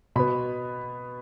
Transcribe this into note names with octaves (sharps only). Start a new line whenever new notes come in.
B2 B3 B5